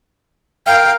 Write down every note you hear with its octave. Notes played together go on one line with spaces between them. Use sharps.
A#4 F5 G5